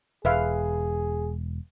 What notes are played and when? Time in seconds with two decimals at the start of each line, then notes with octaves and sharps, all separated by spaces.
0.25 E1 G#4 B4 E5 F5